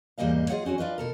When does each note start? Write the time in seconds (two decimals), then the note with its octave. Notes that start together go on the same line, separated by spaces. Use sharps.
0.18 E2 G#2 G3 A#3 D#5 F5
0.49 F4 G#4 C#5 D#5 F5 F#5
0.65 C4 C#4 F#4 G#4 C#5
0.78 D4 F4 B4 D#5
0.98 B2 A4 A#4